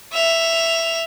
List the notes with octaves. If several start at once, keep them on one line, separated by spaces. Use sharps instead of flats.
E5 F7